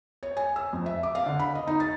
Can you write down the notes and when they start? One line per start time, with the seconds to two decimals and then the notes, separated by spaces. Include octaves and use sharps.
0.23 C#5
0.37 G#5
0.56 E6
0.73 F2
0.86 E5
1.03 D6
1.15 F5
1.26 D3
1.40 B5
1.55 D#5
1.67 D#4
1.80 A6